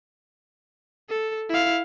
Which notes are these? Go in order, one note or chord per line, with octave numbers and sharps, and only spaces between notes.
A4
E4 F5